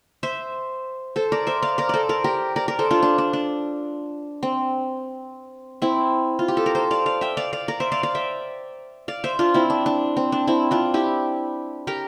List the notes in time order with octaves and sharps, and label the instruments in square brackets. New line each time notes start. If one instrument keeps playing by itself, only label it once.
[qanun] C5 E5
A4 C5
A#4 D5
C5 E5
D5 F5
A#4 D5
A4 C5 D5
A#4 D5
G4 A#4
A#4 D5
A#4 D5
A4 C5
D4 F4
D4
D4
D4
C4
C4 E4
F4
G4
A4
A#4
A4 C5
D5 F5
D5 F5
E5 G5
D5 F5
D5 F5
A#4 D5
C5 E5
D5 F5
D5 F5
E5 G5
D5 F5
C5 E5
D4 F4
C4 E4
D4
D4
C4
D4
C4 E4
D4 F4
E4 G4
G4 A#4